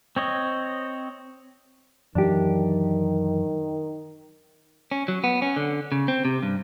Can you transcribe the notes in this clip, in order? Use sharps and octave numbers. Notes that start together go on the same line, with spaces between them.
C4 C#5 D#5
F#2 D#3 E3 F#3 D4 G4
C#4
F#3
B3
C#4
D3
C#3
C4
C3
G2